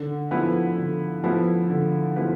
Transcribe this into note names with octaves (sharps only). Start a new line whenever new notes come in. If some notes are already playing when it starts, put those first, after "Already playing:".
Already playing: D3
F3 B3 E4 B4
D3
F3 B3 E4 B4
D3
F3 B3 E4 B4